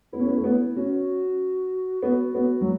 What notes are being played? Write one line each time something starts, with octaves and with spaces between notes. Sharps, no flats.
B3 E4
C#4
B3
A3
B3 E4
C#4 F#4
B3 F#4
B3
F#3